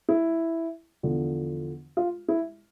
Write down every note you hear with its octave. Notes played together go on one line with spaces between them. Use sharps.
E4
E2 D3 F3
F4
E4